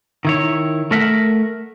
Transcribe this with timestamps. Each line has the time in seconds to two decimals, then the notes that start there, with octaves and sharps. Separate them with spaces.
0.25 D#3 E4 C#5
0.91 A3 A#4 E5 F#5